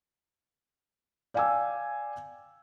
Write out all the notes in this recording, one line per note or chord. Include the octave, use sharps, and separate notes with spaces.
D5 F5 G5 G#5 D6 E6